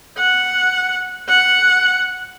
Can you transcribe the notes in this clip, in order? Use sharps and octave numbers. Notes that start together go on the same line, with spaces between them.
F#5
F#5